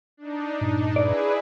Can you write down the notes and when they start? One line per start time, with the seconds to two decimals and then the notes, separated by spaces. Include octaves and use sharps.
0.17 D4 D#4
0.61 G2 A#2
0.96 E4 G#4 B4 D5